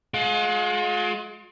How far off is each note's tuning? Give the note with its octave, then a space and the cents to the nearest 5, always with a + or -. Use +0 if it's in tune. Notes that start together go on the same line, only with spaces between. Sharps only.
G#3 +30 F4 +45